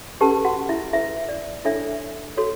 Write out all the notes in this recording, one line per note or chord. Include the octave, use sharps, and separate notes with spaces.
C#4 G4 A4 B4 A5
F#4 F#5
E4 E5
E4 B4 E5
D5
D4 E4 A4 C#5 E5
F#4 A4 C#5